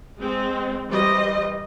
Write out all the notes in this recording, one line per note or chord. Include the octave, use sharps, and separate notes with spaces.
G#3 C4
E3 G3 C5 D#5